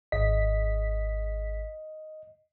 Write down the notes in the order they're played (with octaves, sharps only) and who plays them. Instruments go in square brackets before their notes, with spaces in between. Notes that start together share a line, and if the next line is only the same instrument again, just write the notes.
[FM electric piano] G#1 B6 [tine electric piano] D#5